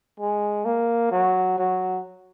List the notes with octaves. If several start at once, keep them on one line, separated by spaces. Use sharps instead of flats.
G#3
A#3
F#3
F#3